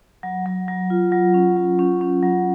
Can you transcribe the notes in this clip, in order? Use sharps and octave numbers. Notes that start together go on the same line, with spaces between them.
F#3
F#3
F#3
F4
F#3
C#4
F#3
C#4
C#4
F#3